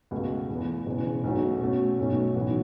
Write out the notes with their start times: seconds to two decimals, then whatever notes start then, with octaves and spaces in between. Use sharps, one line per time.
0.11 C#2 B2 A3 F#4
0.49 E2 E3 B3
0.86 E1 E2 C#3 E3
1.24 B1 B2 A3 C#4 F#4
1.61 B2 A3 C#4 F#4
1.98 B1 B2 A3 C#4
2.35 B1 A2 E3 B3 F#4